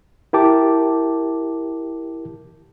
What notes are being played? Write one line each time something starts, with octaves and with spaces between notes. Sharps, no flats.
E4 G4 A#4 G5 A5 D6